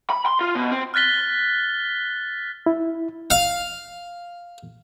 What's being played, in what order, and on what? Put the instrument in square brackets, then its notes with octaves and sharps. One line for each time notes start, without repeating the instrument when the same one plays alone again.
[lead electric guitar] B5
C6
F4
B2
C4
[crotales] F6 F#6 A6 B6 G7
[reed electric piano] E4
[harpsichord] F5